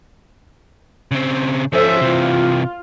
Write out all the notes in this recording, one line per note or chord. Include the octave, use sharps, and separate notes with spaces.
C#3 C4
F3 C#4 A4 C5 E5
C3 E3 F4